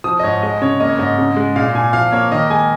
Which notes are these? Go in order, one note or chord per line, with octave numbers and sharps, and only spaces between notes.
F3 D#6
D#5
G#2 C#5
G#3 D#5
C#3 C#5
A#3 D#5
C#5
G#2 D#5
C#3
G#3
A#2 F5
A#2 G#5
F3 F5
A#3 C#5
D#3 D#5
G#3 G#5